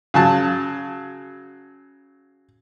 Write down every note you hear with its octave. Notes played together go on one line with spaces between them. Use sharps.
C#3 F#3 A5